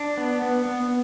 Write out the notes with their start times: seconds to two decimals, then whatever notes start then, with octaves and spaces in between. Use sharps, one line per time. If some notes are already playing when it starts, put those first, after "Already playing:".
Already playing: D4
0.17 B3
0.42 B3
0.65 B3